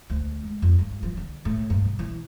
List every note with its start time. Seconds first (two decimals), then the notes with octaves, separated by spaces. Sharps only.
0.10 D2
0.43 G#3
0.62 F2
0.79 G2
1.03 F3
1.17 D3
1.45 A2
1.70 G2
1.85 B2
1.99 E3